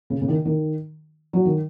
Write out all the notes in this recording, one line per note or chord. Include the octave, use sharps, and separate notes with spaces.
C#3
C#3
D#3
D#3
F#3
D#3